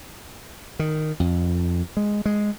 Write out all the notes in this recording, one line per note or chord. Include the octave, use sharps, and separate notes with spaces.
D#3
F2
G#3
G#3